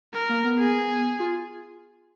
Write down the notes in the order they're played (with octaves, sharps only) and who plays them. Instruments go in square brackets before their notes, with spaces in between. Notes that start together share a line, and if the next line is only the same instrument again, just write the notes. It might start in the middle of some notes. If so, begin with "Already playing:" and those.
[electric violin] A#4
[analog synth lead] A#3
B3
[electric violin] G#4
[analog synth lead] F4